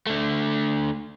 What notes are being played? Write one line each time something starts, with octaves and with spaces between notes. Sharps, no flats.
D3 A3